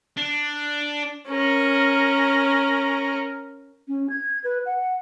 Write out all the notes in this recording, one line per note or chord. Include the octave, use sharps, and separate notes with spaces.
D4
C#4 A#4
C#4
G#6
B4
F#5